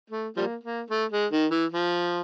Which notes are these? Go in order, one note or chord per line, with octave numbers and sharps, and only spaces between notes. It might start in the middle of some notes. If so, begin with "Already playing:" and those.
A3
F3 G3 A#3
A#3
A3
G#3
D#3
E3
F3